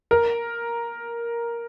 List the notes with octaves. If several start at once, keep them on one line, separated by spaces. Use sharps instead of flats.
A#4